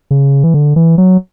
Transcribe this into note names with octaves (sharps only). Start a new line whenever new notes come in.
C#3
E3
D3
E3
F#3